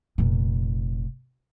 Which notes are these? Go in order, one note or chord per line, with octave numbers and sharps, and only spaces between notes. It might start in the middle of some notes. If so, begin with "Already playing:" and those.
F1 A#2